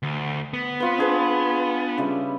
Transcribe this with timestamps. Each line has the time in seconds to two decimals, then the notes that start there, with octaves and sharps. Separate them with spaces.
0.03 D2
0.53 B3
0.80 C4 F4 B4
0.98 D4 G#4 B4
1.98 C#3 G3 E5